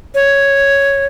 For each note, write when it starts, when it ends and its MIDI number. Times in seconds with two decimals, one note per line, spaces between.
0.15 1.07 73